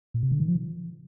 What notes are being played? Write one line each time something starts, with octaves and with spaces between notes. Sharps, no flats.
A#2
C3
D3
D#3
F3